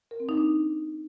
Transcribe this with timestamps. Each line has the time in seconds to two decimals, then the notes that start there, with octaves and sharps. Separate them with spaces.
0.11 A#4
0.20 C4
0.29 D#4
0.37 D4